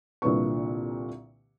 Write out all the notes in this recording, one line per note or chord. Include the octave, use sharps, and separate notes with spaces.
C2 A#2 D3 E3 B4 C#6